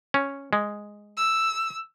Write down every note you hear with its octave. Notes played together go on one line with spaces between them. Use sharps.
C#4
G#3
E6